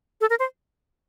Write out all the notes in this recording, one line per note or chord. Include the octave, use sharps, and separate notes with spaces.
A4
A#4
C5